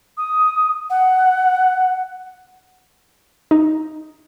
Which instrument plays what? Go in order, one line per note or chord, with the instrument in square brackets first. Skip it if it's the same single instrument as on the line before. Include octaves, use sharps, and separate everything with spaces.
[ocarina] D#6
F#5
[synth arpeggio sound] D#4